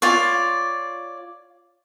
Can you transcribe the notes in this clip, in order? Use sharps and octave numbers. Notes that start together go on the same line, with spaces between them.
F4 C#5 D5